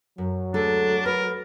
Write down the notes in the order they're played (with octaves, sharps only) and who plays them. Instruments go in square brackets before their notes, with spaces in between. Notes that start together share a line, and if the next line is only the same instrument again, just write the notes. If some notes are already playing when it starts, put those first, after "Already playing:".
[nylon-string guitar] F#2 [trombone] F#3
[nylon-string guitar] D2 G#3 A4 [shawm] D4
[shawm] A#4 [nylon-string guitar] B4